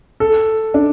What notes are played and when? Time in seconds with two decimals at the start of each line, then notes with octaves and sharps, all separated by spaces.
0.20 A4
0.74 D4